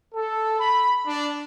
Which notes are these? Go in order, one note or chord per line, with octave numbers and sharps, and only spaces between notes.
A4
B5
D4